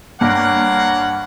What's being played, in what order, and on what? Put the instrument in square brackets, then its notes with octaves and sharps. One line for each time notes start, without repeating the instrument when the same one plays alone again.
[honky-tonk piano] G2 [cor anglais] A#3 [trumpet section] C#5 F#5